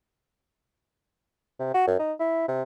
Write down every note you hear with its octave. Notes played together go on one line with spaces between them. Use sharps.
C3
F#4
F#2
D#4
E4
C3